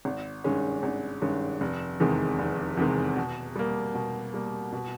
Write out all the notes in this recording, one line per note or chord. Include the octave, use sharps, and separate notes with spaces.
G#1
G2 D#3 G#3 C#4
G#1
G2 D#3 G#3 C#4
F1
E2 C3 D#3 G#3
F1
E2 C3 D#3 G#3
B2
G3 A#3
B2
G3 A#3
B2